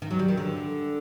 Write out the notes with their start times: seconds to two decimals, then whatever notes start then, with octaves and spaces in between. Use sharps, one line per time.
0.02 D#3
0.10 F#3
0.19 G3
0.28 D#3
0.37 D3